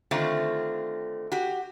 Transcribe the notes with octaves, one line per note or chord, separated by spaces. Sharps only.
D3 D#3 A3 C4 F4
F#4 G4